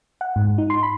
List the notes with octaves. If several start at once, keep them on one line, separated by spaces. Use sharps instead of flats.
F#5
G#2
D#4
C6
B5